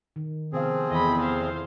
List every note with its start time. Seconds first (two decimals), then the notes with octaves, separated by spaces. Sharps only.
0.16 D#3
0.53 C3 F3 B3 C4 G#4 F5
0.90 E2 A4 D#5 B5
1.20 C5 F5